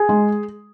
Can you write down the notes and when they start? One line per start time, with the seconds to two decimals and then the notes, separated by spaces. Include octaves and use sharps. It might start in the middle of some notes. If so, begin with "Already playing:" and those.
Already playing: G#4
0.09 G#3